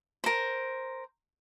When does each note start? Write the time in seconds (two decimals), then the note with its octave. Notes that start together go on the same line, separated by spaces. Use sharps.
0.24 A#4 C5